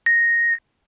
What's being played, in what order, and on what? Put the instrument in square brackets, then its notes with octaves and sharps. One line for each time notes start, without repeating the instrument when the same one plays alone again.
[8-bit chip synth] A#6